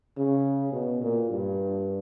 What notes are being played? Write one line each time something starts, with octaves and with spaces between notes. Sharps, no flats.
C#3
B2
A#2
G2